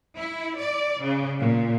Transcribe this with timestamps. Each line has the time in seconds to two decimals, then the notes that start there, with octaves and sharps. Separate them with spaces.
0.16 E4
0.57 D5
1.00 C#3
1.39 A#2